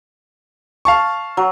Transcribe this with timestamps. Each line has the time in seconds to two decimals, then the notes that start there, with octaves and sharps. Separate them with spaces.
0.85 F5 A5 C#6
1.37 F#3